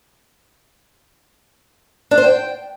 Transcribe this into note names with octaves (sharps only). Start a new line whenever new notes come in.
D4
C5
G5